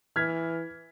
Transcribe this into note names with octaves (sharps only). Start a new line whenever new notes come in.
E3 F6 G#6 B6